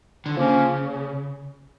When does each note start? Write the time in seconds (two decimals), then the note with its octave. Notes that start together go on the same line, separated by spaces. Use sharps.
0.26 D3
0.35 C#3 F3 A#3 C#4